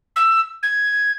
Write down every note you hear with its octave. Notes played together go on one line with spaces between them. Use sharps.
E6
G#6